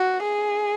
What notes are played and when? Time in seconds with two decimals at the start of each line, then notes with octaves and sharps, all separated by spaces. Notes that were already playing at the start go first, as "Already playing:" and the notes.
Already playing: F#4
0.23 G#4